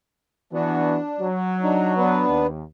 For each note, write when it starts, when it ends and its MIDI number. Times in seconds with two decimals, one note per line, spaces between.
0.53 0.98 52
0.53 0.98 59
0.53 1.27 62
0.53 0.98 66
1.20 2.24 54
1.62 1.93 62
1.62 1.93 63
1.97 2.47 59
1.97 2.47 62
1.97 2.47 71
2.29 2.62 39